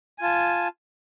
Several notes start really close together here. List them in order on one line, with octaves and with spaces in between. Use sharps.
G#5 F4 A5